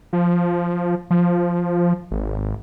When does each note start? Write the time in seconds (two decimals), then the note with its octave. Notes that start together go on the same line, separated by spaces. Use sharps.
0.13 F3
1.10 F3
2.11 G#1